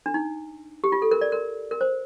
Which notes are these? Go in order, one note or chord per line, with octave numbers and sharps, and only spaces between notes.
D4
D#4
G4
F4
A4
A#4
D5
A#4
A#4
C5